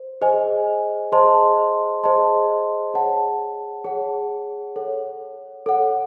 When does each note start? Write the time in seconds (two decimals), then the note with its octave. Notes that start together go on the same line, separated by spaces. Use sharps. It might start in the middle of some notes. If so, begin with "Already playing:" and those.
Already playing: C5
0.21 G#4 C5 D#5 G#5
1.12 G#4 C5 D#5 A5 C6
2.03 G#4 C5 D#5 A5 C6
2.94 G#4 C#5 F#5 A5
3.84 G#4 C#5 F#5 A5
4.76 A4 C#5 F#5
5.66 A4 C#5 F#5